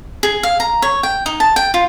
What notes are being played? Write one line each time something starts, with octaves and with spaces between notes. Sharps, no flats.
G#4
F5
A#5
C#5
G5
D#4
A5
G5
F4